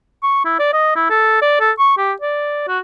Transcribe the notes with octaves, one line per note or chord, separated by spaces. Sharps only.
C#6
E4
D5
D#5
E4
A4
D5
A4
C#6
G4
D5
F#4